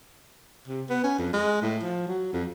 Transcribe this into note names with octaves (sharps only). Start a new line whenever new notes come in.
C3
B3
C#4
F2
G#3
A2
F3
F#3
F2